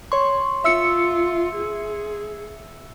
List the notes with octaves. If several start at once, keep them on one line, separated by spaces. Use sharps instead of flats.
C#5 C6 C#6
F4 E5 E6 C#7
G#4